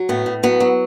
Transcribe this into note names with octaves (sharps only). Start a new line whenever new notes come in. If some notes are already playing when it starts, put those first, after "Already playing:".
Already playing: F#3
A2 B3
A2
F#3 B3
F#3